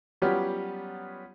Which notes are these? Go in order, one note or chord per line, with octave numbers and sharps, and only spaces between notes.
F#3 G3 B3 C#4 F4 G4